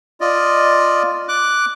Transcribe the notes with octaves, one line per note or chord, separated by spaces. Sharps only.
F4 D5 D#5
D6 F#6